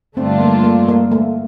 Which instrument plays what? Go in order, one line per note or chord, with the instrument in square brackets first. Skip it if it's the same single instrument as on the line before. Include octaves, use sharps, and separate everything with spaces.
[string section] G2 D3 A3 D4 F4 [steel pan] C4
[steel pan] A#3
A#3
A#3
A3